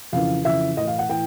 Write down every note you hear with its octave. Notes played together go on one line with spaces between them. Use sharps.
F2 C#3 E3 F5
F2 C#3 E3 E5
A2 E3 D#5
F5
F#5
A2 E3 G5